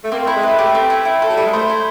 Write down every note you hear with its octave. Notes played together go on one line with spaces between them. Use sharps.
A3
A#3 C4
A3 E4
G#3
A3 B4
A3 G4
C4
E4
E4
F3 A4
F#3
G3 E4
G#3
A3 C5
E4